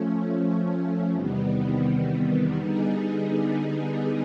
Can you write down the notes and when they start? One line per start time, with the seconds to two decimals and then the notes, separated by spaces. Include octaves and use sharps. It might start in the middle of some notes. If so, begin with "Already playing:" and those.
Already playing: F3 A3 C#4
1.11 E2 C3 D#3 G3 B3
2.56 D3 G3 B3 D#4 G#4